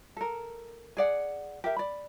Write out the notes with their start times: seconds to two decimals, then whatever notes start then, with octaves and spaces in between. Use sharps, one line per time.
0.17 A4 A#4
0.97 G#4 D5 F#5
1.64 G4 A#4 E5
1.77 D5 B5